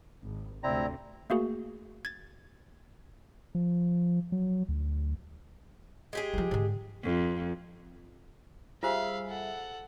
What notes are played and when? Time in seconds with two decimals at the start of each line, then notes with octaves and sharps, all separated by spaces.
0.23 G#1
0.63 D2 C3 C4 E4 D5 A#5
1.30 A3 A#3 F#4 G#4
2.05 G#6 A6
3.55 F3
4.32 F#3
4.69 D2
6.13 G#3 G4 G#4
6.34 E3 F3
6.51 G#2 D3
7.03 F2
8.83 G3 F4 G#4 C5 E5 F5 B5
9.28 A4 F#5